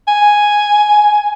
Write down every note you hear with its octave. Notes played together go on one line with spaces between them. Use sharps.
G#5